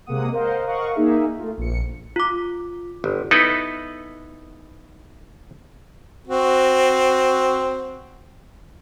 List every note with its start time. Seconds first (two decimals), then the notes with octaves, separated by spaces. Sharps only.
0.06 C3 G#3 A#3 F#5 D#6
0.32 A#4 C5 D#5 F5 F#5
0.66 A#4 D#5 F5 F#5 C#6
0.94 A#3 D#4 G#4 E5
1.38 A3 F4
1.57 A#1 C#7
2.16 F4 D6
3.04 G1
3.31 B3 D#4 E4 A4 B4
6.27 C4 F#4